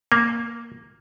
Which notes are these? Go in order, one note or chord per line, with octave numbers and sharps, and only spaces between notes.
A#3